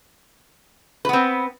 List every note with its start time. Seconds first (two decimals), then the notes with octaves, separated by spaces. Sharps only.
1.05 B4
1.09 B3
1.13 C4